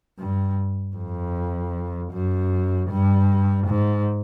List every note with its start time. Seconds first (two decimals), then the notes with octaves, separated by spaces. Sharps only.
0.18 G2
0.96 F2
2.12 F#2
2.90 G2
3.67 G#2